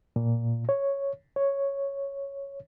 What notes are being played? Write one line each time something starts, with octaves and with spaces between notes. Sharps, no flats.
A#2
C#5
C#5